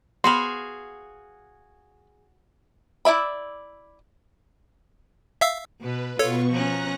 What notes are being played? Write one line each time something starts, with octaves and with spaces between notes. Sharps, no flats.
B3 F#4 G#4 F5 B5 C6
E4 D5 E5 B5
E5 F5 E6
B2 B4
B2 B3 F4 A4 C#5 C#6
F3 C#4 A#5 F#6 A#6